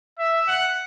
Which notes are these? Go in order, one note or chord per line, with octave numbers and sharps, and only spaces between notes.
E5
F#5